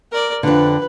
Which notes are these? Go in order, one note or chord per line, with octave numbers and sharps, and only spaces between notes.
A#4 D5
F2 D3 B4